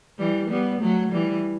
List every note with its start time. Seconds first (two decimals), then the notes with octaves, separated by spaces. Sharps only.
0.18 E3 G3
0.51 G3 B3
0.81 F#3 A3
1.12 E3 G3